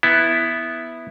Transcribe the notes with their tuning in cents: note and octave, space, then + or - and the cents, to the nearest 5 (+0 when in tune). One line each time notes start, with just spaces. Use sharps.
B3 +0 E4 +0